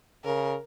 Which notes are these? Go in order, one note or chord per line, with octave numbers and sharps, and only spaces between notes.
C#3 A#4